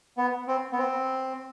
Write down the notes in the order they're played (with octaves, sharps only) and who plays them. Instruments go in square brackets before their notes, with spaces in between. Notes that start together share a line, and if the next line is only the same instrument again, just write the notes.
[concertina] B3
C4
B3
C4